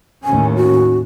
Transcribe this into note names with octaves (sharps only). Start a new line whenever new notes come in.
D#2 A2 C#4 G#5
F#4